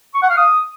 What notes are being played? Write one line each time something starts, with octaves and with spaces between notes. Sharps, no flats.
C#6
F#5
F5
D#6